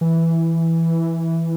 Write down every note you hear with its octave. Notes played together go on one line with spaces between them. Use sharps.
E3